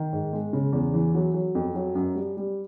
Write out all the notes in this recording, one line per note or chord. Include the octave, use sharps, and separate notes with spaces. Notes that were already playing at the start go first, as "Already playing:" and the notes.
Already playing: D#3
G#2
G#3
C#3
E2
E3
F#3
F#3
F2
F#3
F#2
G3
G3